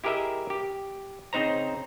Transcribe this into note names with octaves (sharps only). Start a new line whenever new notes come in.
E4 G4 G#4 A#4 D#5 E5
G4
C#3 C4 D#4 C5 A#5